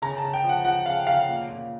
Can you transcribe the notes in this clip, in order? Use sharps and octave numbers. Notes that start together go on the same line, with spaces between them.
C#3 A#5
A5
C#3
G5
F3
F#5
F3 F#5
C#3 F5
C#3 F5
A#2
A#2